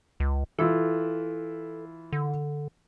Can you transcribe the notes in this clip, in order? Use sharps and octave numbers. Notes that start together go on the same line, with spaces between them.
C#2
E3 E4 F4 A4
D3